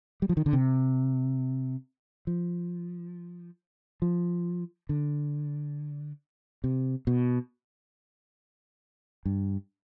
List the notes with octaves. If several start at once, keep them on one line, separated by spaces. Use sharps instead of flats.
G3
F3
D#3
D3
C3
F3
F3
D3
C3
B2
G2